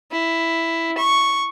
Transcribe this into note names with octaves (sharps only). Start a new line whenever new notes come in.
E4
C#6